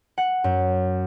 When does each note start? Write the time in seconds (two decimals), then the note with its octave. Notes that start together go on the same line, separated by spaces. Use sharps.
0.18 F#5
0.44 F#2